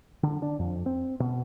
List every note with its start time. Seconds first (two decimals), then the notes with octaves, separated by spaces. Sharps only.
0.23 D3
0.42 D4
0.59 F2
0.86 C4
1.20 B2